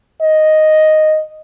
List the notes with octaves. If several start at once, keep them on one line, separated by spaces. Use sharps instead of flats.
D#5